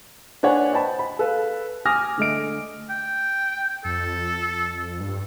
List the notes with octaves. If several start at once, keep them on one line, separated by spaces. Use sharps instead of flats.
D4 B4 C#5 F#5 G#5
C5 D#5 G5 A5 B5
B5
A4 B4 F5
G#5 D6 D#6 F6 A#6
D3 A3 D#5 D7
G5
F2 A4
G2